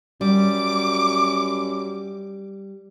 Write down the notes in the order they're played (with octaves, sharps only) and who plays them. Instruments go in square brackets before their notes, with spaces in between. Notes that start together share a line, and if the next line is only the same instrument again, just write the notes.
[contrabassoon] F#2 [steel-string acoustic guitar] G3 [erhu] D6